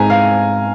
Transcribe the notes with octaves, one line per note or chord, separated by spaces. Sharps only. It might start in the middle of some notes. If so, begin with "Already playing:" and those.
Already playing: G#2 C4 G#5 A#5
F5